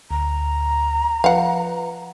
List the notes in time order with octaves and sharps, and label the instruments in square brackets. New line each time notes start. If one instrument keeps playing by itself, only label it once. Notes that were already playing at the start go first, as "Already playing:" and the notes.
[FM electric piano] D2 [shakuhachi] A#5
[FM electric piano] F3 B4 [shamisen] F5 F#5